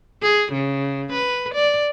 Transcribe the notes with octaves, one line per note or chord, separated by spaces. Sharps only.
G#4
C#3
B4
D5